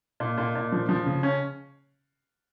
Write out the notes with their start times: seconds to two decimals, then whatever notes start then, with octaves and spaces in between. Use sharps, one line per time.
0.20 A#2
0.38 A#2
0.55 A#2
0.72 F3
0.89 F3
1.06 C#3
1.23 C#4